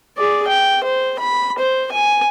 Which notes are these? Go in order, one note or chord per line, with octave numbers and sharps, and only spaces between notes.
G#4 D5
G5
C5
B5
C5
G#5